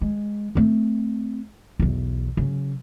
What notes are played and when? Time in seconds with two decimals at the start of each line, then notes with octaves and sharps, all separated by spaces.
0.01 G#3
0.55 A3 C4
1.80 B1 E2
2.37 C#3 F#3